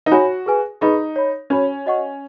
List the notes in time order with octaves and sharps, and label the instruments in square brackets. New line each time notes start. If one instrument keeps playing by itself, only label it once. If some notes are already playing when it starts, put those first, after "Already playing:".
[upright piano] D#4
[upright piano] F#4 [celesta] C#5 G#5 B5
[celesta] G#4 B4 G#5
[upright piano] D#4 [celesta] G#4 B4 D#5 B5
[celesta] C#5 B5
[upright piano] C#4 [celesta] F#4 C#5 B5
[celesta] F#4 D#5 F#5 C#6